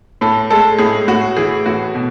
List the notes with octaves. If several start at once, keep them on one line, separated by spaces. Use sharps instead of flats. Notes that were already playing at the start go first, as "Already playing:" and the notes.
A2 A4
G#3 A4
A2 G#4
A2 F#4
E3 G#4
A2 F#4
B2